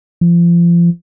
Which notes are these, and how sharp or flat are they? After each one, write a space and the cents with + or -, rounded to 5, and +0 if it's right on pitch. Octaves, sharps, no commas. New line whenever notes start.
F3 -30